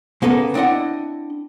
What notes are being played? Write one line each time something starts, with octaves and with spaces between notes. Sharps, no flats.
C#3 A#3 B3 A4 B4
C4 D4 E4 D#5 F#5